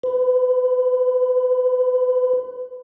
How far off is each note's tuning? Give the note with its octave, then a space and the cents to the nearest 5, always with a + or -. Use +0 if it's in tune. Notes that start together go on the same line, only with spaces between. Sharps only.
B4 +35